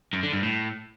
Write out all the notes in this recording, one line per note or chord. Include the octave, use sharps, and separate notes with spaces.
F#2
D3
G2
A2